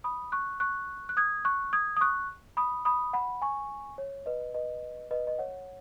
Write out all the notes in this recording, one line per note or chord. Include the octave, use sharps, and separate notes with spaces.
B5 D#6
C#6 F#6
C#6 F#6
F#6
D#6 G#6
C#6 F#6
D#6 G#6
D#6
C#6 F#6
B5 D#6
B5 D#6
F#5 B5
G#5 C#6
C#5
B4 D#5
B4 D#5
B4 D#5
D#5
C#5 F#5